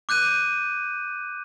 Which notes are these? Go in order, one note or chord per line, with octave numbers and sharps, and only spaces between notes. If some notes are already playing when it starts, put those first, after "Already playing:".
D6 F#6 G6 D#7